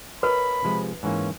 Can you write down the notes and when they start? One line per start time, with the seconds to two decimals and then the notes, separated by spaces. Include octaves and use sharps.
0.23 A#4 B4 C#5 D#5 B5
0.64 C3 F3 G#3
1.03 G#2 E3 A#3 C#4